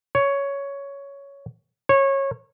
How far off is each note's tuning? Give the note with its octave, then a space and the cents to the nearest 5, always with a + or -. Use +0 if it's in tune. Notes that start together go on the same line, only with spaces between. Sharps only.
C#5 +10
C#5 -20